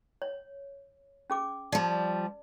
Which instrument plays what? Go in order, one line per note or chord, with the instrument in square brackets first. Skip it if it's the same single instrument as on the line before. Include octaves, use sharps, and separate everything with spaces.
[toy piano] C#5
C#4 G#4 D6
[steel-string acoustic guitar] F3 G3 [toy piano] D5 A5